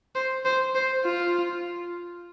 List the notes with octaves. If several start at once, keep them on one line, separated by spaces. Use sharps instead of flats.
C5
C5
C5
F4